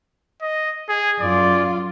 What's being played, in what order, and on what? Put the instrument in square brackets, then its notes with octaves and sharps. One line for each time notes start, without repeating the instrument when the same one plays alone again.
[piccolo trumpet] D#5
G#4
[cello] F#2 F4 [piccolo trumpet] D5